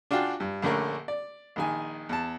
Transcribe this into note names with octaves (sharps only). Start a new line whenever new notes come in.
D4 F4 F#4 F5 G5 G#5
G2
A#1 D3 A3 C#4 A#4
D5
A#1 D#3 G#5
E2 A5